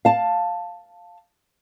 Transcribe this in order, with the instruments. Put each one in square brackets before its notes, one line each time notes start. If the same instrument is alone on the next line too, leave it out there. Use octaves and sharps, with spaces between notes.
[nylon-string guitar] F5 A5